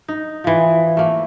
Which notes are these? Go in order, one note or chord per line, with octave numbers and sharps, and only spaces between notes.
D#4
E3 F3
A3 A#3